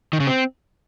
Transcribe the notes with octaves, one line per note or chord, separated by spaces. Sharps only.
D#3
C#3
C4